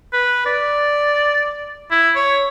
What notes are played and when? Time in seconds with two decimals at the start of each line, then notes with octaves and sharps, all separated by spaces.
0.13 B4
0.46 D5
1.91 E4
2.16 C#5